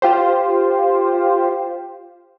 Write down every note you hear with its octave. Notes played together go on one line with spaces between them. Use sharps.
F4 G4 C5